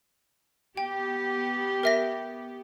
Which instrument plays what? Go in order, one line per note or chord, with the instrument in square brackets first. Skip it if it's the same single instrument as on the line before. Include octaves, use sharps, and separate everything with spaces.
[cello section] B3 G4 [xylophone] G5
[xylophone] A#4 E5 A#6